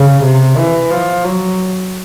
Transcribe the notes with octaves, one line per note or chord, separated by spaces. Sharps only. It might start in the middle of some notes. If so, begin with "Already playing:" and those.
Already playing: C#3
C3
E3
F3
F#3